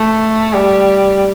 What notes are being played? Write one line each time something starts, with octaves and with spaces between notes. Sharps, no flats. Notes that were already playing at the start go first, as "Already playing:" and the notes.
Already playing: A3
G3